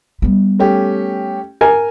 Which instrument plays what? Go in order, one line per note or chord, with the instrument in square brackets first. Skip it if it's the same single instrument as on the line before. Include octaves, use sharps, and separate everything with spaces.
[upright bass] G3 B3
[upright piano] A3 C#4 G4
[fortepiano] A#4 G#5